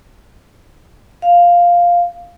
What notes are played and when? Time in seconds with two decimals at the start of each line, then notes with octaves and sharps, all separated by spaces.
1.22 F5